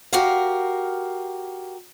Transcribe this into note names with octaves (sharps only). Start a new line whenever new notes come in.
F#4 G4 A#4 F5